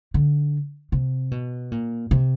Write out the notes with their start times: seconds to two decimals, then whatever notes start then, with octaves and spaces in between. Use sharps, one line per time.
0.14 D3
0.92 C3
1.31 B2
1.72 A#2
2.11 C3